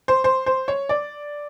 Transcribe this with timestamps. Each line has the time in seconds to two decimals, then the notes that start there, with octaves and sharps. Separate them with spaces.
0.08 C5
0.24 C5
0.46 C5
0.68 C#5
0.89 D5